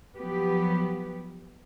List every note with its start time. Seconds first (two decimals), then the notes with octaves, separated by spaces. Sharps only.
0.17 F3 F#3 B3 G4 B4